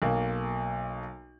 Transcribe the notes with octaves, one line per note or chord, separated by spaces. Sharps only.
B1 A#3